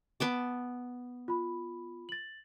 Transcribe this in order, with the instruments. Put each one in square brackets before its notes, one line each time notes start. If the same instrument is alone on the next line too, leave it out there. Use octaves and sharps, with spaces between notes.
[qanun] B3 A5 D6
[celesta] F4 B5
A6 F#7